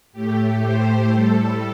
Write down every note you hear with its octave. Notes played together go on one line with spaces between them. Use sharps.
A2 A3 G4
C5
A2 G3 A4